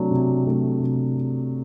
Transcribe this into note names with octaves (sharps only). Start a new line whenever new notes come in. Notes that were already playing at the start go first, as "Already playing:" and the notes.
Already playing: C3 F#3 A3 D4
C3
F#3 A3 D4
C3